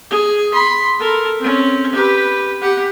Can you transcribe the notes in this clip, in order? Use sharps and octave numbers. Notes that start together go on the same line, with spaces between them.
G#4
B5 C6
A4 A#4
C4 C#4
G4 B4
G4 F#5